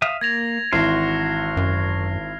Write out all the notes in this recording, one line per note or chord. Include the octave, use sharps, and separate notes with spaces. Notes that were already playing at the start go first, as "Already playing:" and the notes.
E5 F5 D#6
A#3 G#6 A#6 F7
G#1 E3 F#4 E5 C6 F6 C7
F#2